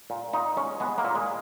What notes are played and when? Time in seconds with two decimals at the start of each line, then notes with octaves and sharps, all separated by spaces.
0.10 A#2
0.33 A#2 D#4
0.56 G#3 C#4
0.80 G#3 B3
0.98 A#3
1.04 A#2
1.15 G#3